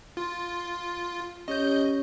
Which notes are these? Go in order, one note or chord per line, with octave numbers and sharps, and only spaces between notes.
F4
C#4 G4 C#5 D#5 G6